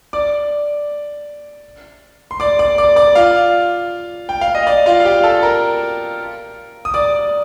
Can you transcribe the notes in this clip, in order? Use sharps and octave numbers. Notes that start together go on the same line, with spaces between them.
D5 D6
C6
D5 D6
D5 D6
D5 D6
D5 D6
F4 F5
G5
F5
D#5
D5
F4 F5
F5
G4 G5
A4 A5
A#4 A#5
D#6
D5 D6